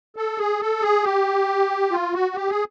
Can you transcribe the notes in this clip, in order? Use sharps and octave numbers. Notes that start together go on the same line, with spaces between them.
A4
G#4
A4
G#4
G4
F4
F#4
G4
G#4